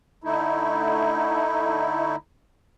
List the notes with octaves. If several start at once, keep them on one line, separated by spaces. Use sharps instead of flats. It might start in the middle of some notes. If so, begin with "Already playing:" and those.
D3 A3 D#4 E4